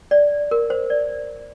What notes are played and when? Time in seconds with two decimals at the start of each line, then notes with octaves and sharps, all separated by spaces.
0.11 D5
0.51 A#4
0.70 C5
0.90 D5